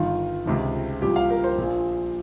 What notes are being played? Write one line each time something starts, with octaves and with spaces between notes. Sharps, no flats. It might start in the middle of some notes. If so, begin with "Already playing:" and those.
Already playing: G1 G2 D#3 F4
C#2 C3 D#3
C2 A#2 F3 G4
F5
A#4
C5
A#1 A#2 F3